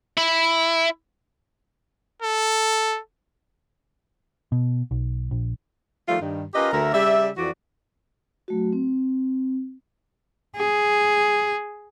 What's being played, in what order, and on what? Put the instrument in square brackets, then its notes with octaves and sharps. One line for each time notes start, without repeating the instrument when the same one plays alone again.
[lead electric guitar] E4
[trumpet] A4
[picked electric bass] B2
B1
A#1
[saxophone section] D#3 F3 G3 A3 F4
G2 D#3
C#4 F4 G4 A#4 B4 D#5
D2 A#4 E5
C#3 G3 D5 E5
F2 E3 F#4 D5
[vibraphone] F#3 A3 F#4
C4
[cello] G#4